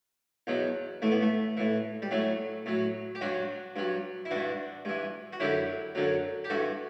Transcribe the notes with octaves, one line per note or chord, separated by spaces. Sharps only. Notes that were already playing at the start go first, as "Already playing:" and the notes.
E2 B2 F#3
A2 E3 A3
B3
A3
A2 E3
G3
A2 F#3 A3
A2 F#3
G4
G2 F#3 D4 F#4
G2 F#3
E4
G2 E3 D4 F#4
G2 E3
F#4
F#2 D3 F#3 E4 G4
F#2 D3 F#3
G4
G2 E3 F#4 A4